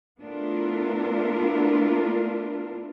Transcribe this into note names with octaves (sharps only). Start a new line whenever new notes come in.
A3 B3 D4 E4 F4 A#4